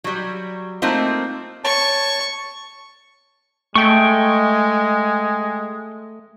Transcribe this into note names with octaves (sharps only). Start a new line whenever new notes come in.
F#3 G3
A3 A#3 C4 D#4 F4 C5
C#5 A5 C#6
G#3 A3 G5 C#6